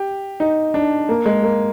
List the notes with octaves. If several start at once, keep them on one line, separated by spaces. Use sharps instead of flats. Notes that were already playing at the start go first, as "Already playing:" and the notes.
Already playing: G4
D#4
D4
A#3
G#3
A#3